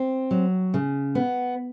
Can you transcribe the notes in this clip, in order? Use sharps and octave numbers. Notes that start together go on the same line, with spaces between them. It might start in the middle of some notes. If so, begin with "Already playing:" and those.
Already playing: C4
F#3
C#3
B3